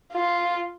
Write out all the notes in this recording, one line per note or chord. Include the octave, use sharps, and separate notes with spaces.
F4